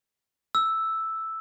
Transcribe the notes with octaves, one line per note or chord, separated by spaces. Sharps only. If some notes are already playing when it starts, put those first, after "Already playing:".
E6